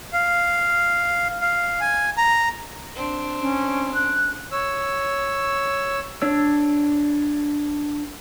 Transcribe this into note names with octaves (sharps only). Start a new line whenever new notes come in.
F5
F5
G#5
A#5
C4 D4
C#4
F#6
C#5 E6
D4 C#5 E6